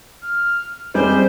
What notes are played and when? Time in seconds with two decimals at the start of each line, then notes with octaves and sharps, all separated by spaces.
0.22 F6
0.94 G3 G#3 C4 C5